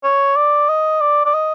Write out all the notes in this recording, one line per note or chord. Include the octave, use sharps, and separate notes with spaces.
C#5
D5
D#5
D5
D5
D#5